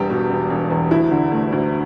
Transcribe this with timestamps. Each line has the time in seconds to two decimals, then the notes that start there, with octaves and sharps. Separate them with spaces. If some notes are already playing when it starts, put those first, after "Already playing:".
Already playing: E1 E2 G3 G4
0.10 B2
0.30 E1
0.50 E1
0.70 E2
0.91 D2 E4
1.11 D3
1.32 A3
1.52 D2